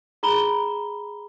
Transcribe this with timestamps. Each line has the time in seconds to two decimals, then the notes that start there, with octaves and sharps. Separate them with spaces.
0.23 G#4 A#5 B5 G7